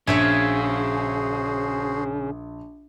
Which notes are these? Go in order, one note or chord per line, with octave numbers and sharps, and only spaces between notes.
A#1 C#3 F#4 G#4 C5 C#5 E5 G#5